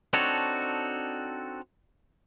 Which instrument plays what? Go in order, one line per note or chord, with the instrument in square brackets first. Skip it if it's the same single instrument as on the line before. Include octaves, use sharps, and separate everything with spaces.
[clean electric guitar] C4 D4 D#4 F#4 A4 C#5